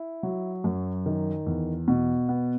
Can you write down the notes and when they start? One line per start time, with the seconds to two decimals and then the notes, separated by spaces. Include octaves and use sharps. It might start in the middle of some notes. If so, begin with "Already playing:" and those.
Already playing: E4
0.23 F#3
0.64 F#2
1.06 D#3
1.47 E2
1.88 B2
2.29 B3